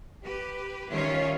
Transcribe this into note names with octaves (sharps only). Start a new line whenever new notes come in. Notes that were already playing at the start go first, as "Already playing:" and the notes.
G4 B4
D#3 G3 C#4 F4 C#5 E5